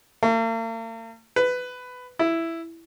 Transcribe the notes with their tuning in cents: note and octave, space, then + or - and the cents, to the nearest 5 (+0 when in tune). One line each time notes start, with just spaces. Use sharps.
A#3 -45
B4 +15
E4 +5